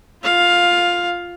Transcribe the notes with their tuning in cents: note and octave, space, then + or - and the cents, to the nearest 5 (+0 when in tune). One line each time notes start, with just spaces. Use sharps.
F4 +0 F5 +10